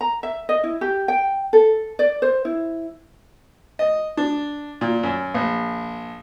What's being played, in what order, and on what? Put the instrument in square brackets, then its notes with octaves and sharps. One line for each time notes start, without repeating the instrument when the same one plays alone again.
[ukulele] A#5
E5
D#5
E4
G4
G5
A4
D5
C5
E4
[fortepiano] D#5
D4
A#2
F#2
A#1